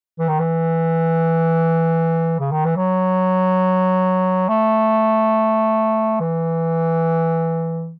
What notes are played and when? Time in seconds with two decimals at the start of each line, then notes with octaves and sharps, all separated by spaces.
0.19 E3
0.29 D#3
0.39 E3
2.40 C#3
2.52 D#3
2.65 E3
2.76 F#3
4.49 A3
6.20 E3